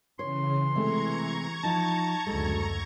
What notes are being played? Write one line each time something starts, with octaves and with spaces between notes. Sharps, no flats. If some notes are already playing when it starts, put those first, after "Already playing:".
C#3 E3 C#5 C6
C3 G#3 A3 A#5 C#6 G#6
F3 D#4 A5
F#1 D2 G#3 A4